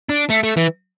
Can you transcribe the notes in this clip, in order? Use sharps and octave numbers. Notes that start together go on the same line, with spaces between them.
D4
A3
A3
E3